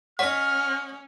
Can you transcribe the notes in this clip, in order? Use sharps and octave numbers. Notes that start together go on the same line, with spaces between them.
C#4 C#5 D#5 F#5 F6